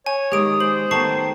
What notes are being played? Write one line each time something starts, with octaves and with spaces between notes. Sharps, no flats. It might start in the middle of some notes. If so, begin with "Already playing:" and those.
C#5 G#5
D#3 G#3 A#3 G4 D#6 D7
C5 F#7
D#3 A3 B3 G5 A5 C#6 C7